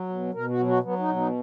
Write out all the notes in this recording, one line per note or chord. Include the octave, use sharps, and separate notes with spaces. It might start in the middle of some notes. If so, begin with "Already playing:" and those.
Already playing: F#3
B2
B2 A#4
F#4
F#3
F#4
F#3 B3
D#4
B2
D#4